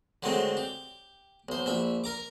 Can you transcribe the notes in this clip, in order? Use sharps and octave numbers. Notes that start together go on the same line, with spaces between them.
D3 D#3 F#3 G#3 A3 C4
G4
B1 C5
A#1 E5 B5
A#4 A#5 D6